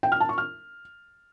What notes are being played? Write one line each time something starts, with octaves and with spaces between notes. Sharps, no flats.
G5
F6
A5
C#6
F6